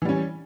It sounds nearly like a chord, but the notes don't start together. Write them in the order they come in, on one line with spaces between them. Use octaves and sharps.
E3 G3 C#4